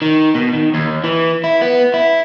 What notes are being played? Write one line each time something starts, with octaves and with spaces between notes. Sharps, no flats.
D#3
B2
D#3
D#2
E3
E4
B3
E4